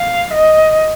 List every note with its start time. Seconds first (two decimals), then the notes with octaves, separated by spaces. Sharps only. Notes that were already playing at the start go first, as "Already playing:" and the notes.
Already playing: F5
0.32 D#5